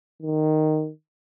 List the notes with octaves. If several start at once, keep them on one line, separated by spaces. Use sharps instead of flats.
D#3